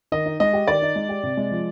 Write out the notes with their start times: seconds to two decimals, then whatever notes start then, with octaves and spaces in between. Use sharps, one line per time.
0.12 D#3 D#5
0.26 D#4
0.40 G#3 D#5
0.53 G4
0.68 D#3 D5
0.82 D#4
0.96 G#3
1.09 G4
1.23 C3
1.37 G#3
1.51 F3